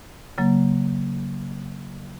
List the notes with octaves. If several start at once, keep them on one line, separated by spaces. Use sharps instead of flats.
C#3 F#3 A#3